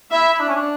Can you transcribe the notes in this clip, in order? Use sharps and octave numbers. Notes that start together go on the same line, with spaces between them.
E4 E5
E4
D4
C#4
D4